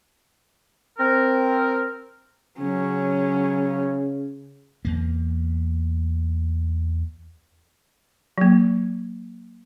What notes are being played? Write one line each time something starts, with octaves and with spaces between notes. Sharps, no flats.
C4 A#4
C#3 F#3 C#4
E2 A#3
F#3 A#3